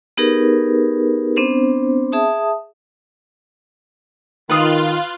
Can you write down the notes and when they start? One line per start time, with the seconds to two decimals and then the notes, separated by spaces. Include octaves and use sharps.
0.17 B3 D#4 G4 G#4 A#4 B4
1.36 B3 C4 D4 C5
2.12 G#4 E5 A5 D#6
4.49 D#3 F4 B4 D#6